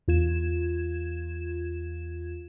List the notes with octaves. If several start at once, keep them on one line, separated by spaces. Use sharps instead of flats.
E2 F4 G#6 E7